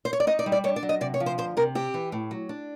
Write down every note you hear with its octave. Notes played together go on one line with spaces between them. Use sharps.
C5
C#5
D5
D#4 D#5
D5
G3
D5
D4 C#5
D5
F#3
D#5
C3 D5
C#5
F3
C5
D2 C5
C3 A#4
C4 G4
E3
A2
F#3
D4